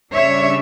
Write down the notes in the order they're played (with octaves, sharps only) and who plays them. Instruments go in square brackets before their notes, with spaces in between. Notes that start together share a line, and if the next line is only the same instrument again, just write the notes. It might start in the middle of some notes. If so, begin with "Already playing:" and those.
[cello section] C#3 G3 D4 C#5 E5